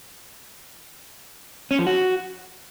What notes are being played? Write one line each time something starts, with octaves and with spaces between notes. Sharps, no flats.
C#4
F3
F#4